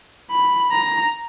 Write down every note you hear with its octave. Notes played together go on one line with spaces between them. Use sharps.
B5
A#5